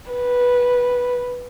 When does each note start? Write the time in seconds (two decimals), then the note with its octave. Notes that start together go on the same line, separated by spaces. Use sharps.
0.12 B4